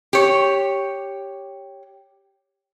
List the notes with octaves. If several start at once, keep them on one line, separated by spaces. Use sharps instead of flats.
G4 C#5